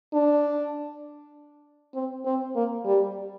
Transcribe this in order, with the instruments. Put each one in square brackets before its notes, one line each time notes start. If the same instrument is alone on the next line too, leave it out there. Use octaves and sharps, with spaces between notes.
[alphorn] D4
C4
C4
A#3
G3